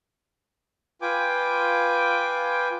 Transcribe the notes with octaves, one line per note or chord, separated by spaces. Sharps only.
F4 B4 G5 G#5 D6